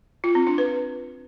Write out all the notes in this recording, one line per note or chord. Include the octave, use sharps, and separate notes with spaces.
F4
C4
D4
B4